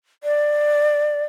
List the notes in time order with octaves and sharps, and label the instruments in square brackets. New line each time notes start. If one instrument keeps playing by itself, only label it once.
[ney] D5